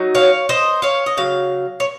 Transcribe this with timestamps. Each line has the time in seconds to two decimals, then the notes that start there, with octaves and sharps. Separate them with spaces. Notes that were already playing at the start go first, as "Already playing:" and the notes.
Already playing: F#3 D#4
0.15 C#5 F5
0.49 C5 D#5
0.82 C#5 F5
1.06 D#5
1.17 C#3 F#3 F5
1.80 C#5